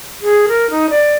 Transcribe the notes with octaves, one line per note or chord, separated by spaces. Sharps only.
G#4
A#4
D#4
D5